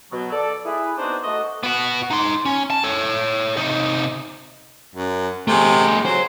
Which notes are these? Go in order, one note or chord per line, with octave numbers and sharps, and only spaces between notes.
B2 F#3
A4 D5
E4 G#4 B4
B3 C4 D4 D#4 F#4 C5
A3 F#4 D#5
B3 F#4
D#4 C6
C#4
A5
A4 C#5
C3 D#4
F#2
C3 A3 G#4
F#3 C5